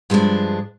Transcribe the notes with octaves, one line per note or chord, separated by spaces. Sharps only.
G2 F3 G#3 D4